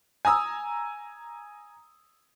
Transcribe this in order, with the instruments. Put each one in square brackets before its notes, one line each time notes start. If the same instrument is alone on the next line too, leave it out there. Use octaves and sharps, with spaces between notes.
[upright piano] G#5 A#5 D#6 E6